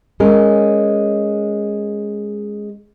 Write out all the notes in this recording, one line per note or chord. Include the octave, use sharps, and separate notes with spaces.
G#3 C#4 A#4